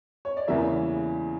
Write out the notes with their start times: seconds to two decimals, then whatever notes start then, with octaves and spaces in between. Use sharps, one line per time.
0.25 C#5
0.37 D5
0.48 E2 C#3 E3 G3 A#3 E5